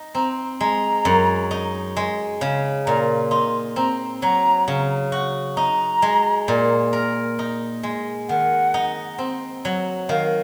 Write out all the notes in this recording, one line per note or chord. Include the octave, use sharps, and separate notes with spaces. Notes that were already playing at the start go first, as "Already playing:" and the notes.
Already playing: D#4
C4 A#5
G#3 A#5
F#2
D#4
G#3
C#3
A#2 A#5
D#4 C6
C4 A#5
F#3 A#5
C#3
F#4
D#4 A#5
G#3
A#2
A#4
D#4
G#3
D#3 F#5
D#4
C4
F#3
D#3 F5